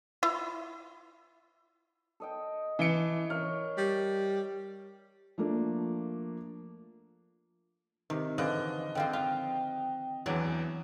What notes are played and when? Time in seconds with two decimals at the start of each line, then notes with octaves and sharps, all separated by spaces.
0.23 E4 F4
2.20 A4 D#5 G5
2.79 E3 C#7
3.30 A#4 C#5 F5 F6
3.77 G3
5.38 F3 A3 A#3 D4
8.10 C3 D#3
8.38 D3 E3 F3 D#5 F#6
8.95 D3 F3 C4 G5
9.13 F4
10.26 E2 E3 F#3 D4 G#4